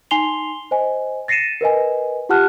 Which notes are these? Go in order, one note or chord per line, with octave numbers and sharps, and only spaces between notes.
D#4 G#5 C6 C7 F7 G7
C5 D#5 G#5
A6 A#6 C7 C#7 D#7 E7
A#4 B4 D#5 G#5
F4 G4 F#5 A5 F6 F#6